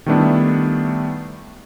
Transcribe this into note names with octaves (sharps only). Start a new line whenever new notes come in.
D#3 G3 A3 B3 D4 E4